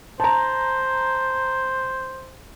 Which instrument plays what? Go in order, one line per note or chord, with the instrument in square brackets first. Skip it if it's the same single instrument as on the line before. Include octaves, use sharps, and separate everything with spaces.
[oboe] C5 [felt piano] A5 A#5